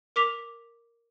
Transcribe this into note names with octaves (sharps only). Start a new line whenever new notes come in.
A#4 D6 B6 F7